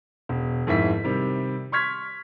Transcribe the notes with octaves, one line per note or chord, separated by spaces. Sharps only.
E1
F2 G#2 D#3 E4 B6
C3 D#3 G3
C6 C#6 F6 G#6 B6